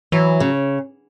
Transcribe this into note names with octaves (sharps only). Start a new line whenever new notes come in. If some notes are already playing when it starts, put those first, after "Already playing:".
E3 F#3
C#3